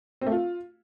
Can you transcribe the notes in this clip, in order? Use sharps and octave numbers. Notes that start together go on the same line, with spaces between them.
C4
A3
F4